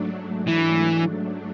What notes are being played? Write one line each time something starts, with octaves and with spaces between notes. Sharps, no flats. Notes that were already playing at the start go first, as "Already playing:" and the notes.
Already playing: G#2 F#3 A3 D4
E3